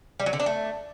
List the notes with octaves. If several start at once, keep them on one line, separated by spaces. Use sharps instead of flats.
G3
F#3
D3
D4
A3